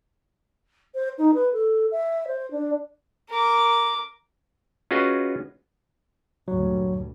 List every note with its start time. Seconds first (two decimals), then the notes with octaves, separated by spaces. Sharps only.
0.94 C5
1.18 D#4
1.34 B4
1.53 A4
1.91 E5
2.27 C5
2.51 D4
3.29 A#4 D6
4.91 C#4 F4 F#4 G#4 B4 D#5
6.48 D2 G2 A#2 F#3